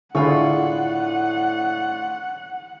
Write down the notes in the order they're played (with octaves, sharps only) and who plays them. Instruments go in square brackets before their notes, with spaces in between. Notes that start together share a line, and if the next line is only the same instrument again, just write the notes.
[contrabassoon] A2 [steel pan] D3 E4 G#4 [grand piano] D4 F4 C#6 [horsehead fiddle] F#5